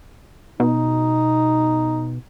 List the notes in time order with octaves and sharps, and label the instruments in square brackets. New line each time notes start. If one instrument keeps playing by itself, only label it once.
[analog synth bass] B2 [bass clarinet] D#4